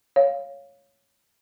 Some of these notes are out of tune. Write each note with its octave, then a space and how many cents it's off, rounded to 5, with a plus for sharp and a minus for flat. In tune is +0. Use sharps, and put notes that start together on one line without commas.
C#5 +0 F5 +0